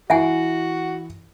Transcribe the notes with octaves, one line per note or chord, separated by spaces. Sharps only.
E3 E4 F#4 E5 F#5 G#5